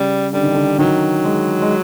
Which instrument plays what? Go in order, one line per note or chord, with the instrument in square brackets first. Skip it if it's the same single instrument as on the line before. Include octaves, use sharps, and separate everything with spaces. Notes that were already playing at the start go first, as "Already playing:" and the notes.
Already playing: [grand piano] C#3 [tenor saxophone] G3
[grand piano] D3 [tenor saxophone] G3
[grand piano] D#3
D3
[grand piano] D#3 [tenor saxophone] F#3
[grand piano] G#3
G#3